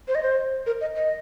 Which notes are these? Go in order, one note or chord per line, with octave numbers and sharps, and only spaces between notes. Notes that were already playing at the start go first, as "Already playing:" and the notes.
C5
D#5
C5
A#4
D#5
D#5